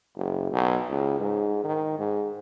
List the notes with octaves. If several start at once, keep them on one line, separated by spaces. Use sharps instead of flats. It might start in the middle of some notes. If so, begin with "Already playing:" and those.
F#1
B1
C#2
G#2
D#3
G#2